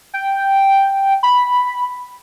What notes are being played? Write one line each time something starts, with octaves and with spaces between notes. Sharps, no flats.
G5
B5